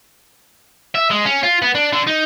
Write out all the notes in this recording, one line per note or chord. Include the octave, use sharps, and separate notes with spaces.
E5
G#3
C#4
F4
B3
D4
D3
D#4